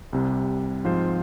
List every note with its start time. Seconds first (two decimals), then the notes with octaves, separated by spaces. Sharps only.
0.13 C2 C3 G3
0.84 G#2 F3 C4 F4 C5